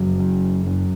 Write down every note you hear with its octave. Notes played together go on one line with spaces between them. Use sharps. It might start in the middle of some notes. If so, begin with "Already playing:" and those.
Already playing: F#1 F#3
F#2
F#2